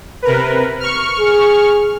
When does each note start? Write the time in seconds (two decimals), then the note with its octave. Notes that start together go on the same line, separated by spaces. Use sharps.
0.22 C3 A#4 B4
0.80 C#6 F6
1.19 G#4